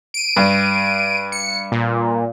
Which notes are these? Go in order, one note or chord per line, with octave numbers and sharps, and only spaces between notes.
D7 D#7
G2
C#7
A#2